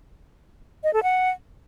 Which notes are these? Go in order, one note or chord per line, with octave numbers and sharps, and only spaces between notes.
D#5
A4
F#5